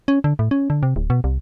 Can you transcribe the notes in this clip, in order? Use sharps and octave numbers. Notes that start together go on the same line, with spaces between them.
C#4
D3
A2
C#4
D3
C3
D1
B2
C2